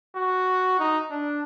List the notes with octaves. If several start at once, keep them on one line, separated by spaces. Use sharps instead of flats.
F#4
D#4
D4